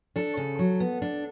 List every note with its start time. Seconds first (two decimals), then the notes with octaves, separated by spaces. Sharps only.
0.16 D4 A4
0.37 C#3
0.59 F#3
0.80 B3
1.02 D4